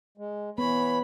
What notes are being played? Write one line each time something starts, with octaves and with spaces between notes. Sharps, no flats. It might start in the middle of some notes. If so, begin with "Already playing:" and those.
G#3
E3 B3 C#5 B5